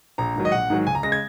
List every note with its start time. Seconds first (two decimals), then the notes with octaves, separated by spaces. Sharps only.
0.18 A#1 A#5
0.36 G#2 D#3 F#3
0.45 D#5
0.52 A#1 F#5
0.70 G#2 D#3 F#3
0.87 C#2 G#5
0.95 A#5
1.03 C#3 G#3 A#6
1.12 G#6